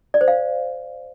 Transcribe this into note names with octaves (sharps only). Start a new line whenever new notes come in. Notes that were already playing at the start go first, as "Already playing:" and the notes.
D5
C5
F5